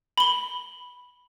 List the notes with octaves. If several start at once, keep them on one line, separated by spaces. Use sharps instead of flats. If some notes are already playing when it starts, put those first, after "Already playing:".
B5 G7